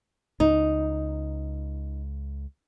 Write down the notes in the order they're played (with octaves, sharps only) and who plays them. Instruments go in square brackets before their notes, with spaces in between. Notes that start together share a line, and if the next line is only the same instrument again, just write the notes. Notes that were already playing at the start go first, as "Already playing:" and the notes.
[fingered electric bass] C#2 [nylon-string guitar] D#4